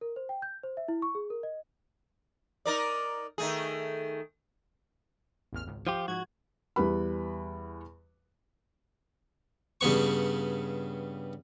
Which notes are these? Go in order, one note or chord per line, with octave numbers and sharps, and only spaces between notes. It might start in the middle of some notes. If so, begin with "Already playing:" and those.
A#4
C5
G5
G6
C5
E5
E4
C#6
G#4
A#4
D#5
D#4 A#4 D5
D#3 A3 G#4
A1 E2 F6
G#1 C#2
F3 F4 G4
G#2 F3 F#4 G#6
E2 G3 B4 B5
G2 C#3 B3 C#6